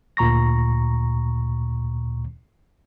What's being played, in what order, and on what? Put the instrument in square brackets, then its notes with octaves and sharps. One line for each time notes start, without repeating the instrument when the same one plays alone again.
[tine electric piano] D2 A#2 A#5 C#6 A#6